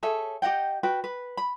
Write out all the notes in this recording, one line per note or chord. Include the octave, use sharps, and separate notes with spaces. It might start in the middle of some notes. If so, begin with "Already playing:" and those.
G#4 A4 C#5 E5
G4 D#5 F#5 G5
F#4 B4 G5
B4
B5